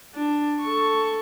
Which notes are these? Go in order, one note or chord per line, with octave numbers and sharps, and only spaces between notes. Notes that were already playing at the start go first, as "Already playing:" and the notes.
D4
A4 C#6